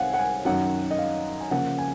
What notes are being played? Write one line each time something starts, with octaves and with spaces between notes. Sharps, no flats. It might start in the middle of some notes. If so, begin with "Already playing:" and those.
Already playing: C2 C3 D#3 C4 F5 F#5 G#5
F#5
G#5
F#2 D#3 F#3 F#5
D#5
F5
G#5
C#3 F3 A#3 F#5
G#5